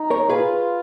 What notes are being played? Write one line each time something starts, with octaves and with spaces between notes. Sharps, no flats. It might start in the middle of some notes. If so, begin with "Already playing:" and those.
Already playing: D#4
A#4 C#5
F4 G#4 B4